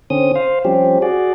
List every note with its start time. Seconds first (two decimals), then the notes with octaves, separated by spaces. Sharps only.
0.10 D3 C4 C#4 D#6
0.35 C5 F5
0.65 F3 G3 C4 C#4 G4
1.02 F#4 G#4 D5